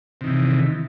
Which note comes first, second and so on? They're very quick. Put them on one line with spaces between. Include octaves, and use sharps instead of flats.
C3 D#3 E3